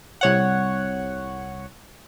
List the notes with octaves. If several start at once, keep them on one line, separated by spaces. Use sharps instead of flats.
C2 C#5 F#5